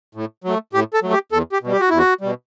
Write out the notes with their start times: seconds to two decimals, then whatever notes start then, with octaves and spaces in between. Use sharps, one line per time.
0.15 A2
0.44 F#3 A3
0.73 A2 G4
0.94 A4
1.03 F#3 A3
1.13 G4
1.32 E2 A4
1.52 G4
1.62 B2 G3
1.72 G4
1.81 F#4
1.90 E2 E4
1.98 F#4
2.21 B2 G3